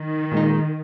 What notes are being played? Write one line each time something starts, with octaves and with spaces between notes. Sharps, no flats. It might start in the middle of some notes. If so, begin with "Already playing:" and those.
Already playing: D#3
A#2 G#3 D#4